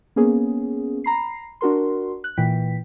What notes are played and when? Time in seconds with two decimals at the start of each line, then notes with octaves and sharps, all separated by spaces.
0.16 A#3 B3 C#4 G#4
1.04 A#5 B5 C7
1.61 D4 F#4 A#4 C6
2.24 F#6
2.37 A#2 E3 G5 B6